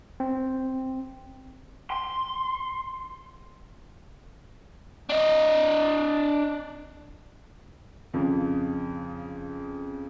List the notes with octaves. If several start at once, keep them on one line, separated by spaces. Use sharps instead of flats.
C4
C6
D4 D#5
F2 C#3